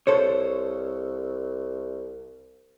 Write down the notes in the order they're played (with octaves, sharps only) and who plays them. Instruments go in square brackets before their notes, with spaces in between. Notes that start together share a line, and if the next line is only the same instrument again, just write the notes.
[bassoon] C2 [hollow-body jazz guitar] A4 C5 C#5